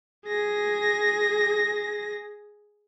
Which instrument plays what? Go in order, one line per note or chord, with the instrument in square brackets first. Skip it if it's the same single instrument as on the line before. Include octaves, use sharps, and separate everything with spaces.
[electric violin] G#4 A#6